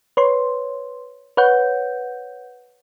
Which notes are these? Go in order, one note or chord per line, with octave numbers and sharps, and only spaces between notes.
B4 C#5 C6
B4 C#5 F#5 G6